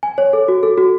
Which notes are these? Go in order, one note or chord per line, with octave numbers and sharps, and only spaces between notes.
G#5
C#5
A4
F#4
A4
F#4